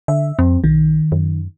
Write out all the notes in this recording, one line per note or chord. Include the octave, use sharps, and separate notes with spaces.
D3 E5
F2 C4
B1 D#3
F#2